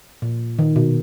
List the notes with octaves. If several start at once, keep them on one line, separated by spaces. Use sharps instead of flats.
A#2
D#3
B2